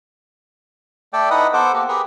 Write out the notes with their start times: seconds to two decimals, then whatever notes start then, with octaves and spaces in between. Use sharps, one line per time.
1.13 A3 A4 D5 G5
1.31 D#4 E4 B4 D#5 F#5 D#6
1.53 B3 A4 C5 F#5 D6
1.73 A#3 G4
1.88 G4 G#4 A#4 B4